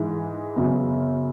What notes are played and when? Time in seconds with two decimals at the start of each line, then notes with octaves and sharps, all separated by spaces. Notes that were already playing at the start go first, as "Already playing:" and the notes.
Already playing: G#2 E3 G#3
0.56 F#2 C#3 F#3 B3